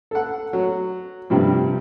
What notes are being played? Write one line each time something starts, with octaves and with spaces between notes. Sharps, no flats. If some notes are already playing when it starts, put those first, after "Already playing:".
A4 F#5
F#3
G2 C3 F3 G3